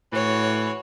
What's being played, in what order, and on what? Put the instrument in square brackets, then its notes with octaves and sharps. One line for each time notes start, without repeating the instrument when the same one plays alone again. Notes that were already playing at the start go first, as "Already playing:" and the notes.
[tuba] A2 [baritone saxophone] E3 [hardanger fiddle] F#4 C#5